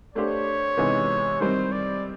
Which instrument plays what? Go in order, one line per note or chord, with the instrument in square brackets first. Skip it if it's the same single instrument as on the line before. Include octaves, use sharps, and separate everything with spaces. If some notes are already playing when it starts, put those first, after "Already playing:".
[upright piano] A3 D4 G4 C5 [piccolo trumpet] C#5
[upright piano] C3 E3 G#3 B3 D#4
[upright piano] D#3 G3 C4 [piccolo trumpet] C5
[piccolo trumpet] D5